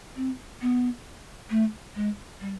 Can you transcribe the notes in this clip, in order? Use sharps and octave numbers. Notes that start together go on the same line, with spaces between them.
C4
B3
A3
G#3
G3